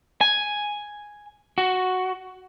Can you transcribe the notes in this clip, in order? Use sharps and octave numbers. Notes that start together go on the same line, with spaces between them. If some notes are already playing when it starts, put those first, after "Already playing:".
G#5
F#4